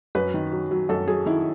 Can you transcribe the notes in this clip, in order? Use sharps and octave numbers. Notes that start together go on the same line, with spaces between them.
F#2 B4
D#3
F#3
F#3
F#2 A4
F#3 G#4
D#3 E4